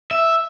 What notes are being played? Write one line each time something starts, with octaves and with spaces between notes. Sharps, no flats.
E5